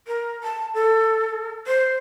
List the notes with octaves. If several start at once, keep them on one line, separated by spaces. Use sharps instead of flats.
A#4
A5
A4
C5